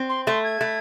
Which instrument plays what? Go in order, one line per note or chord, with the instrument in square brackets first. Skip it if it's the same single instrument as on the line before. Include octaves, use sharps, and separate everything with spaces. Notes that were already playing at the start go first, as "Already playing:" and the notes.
Already playing: [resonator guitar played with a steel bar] C4
[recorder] C6
[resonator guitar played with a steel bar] A3 [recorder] C6
[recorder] G#6
[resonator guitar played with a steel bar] A3